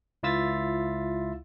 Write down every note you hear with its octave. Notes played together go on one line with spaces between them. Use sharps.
C#2 E4 F4 E5 E6 A6